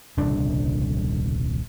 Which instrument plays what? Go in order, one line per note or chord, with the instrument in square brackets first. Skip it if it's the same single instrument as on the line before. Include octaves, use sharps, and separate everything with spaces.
[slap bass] D#1 C2 C#3 D4